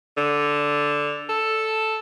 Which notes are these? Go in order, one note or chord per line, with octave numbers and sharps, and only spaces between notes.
D3
A4